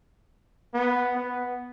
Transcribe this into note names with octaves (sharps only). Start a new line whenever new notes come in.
B3
B3